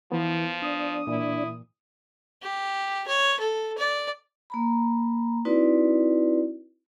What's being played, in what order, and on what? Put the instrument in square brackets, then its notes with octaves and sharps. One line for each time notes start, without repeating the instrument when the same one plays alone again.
[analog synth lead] E3 [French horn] F3 [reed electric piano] B3
[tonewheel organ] D4 [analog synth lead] D#6
[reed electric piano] A#2 E3 [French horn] E4
[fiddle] G4
C#5
A4
D5
[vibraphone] A#3 A#5 B5
C4 D#4 E4 F#4 B4 D5